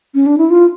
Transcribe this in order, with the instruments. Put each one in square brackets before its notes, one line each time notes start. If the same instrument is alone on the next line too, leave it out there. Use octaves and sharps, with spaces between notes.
[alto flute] C#4
D4
E4
F4